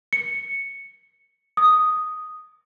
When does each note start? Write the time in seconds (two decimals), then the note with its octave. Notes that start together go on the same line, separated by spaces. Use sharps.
0.13 C#7
1.57 D#6